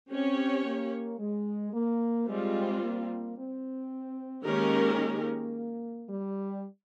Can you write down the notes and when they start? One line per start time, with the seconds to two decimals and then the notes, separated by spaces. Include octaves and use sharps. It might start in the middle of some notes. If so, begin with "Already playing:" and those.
0.11 C4 C#4 G4 C#5
0.65 A#3
1.19 G#3
1.73 A#3
2.28 G3 G#3 C4 F4
2.82 A#3
3.37 C4
4.45 D#3 G#3 A#3 C#4 G4 A#4
6.09 G3